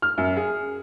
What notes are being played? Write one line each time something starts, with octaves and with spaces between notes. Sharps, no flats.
F6
F#2
G#4